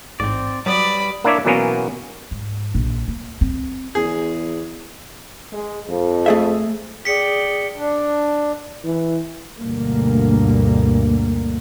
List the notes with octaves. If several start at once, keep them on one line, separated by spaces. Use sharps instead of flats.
A1 G#2 C4 D5
F#3 G3 B4 D5 B5 D#6
A#3 D4 E4 C#5 D5 E5
B2 E3 F#3 A#3 B3 C#4
G#2
A#1
A#3
C4
E2 G#4
G#3
F2
A3 G#4 E5
G#4 D5 G5 B6 C#7
D4
E3
D2 G2 B2 A#3